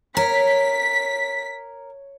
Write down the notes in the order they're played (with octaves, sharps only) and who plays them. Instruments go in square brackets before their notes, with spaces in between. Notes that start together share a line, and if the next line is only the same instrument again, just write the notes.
[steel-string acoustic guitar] A#4 [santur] C#5 [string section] B6